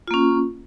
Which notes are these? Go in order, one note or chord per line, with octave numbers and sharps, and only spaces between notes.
A#3 C#4 F4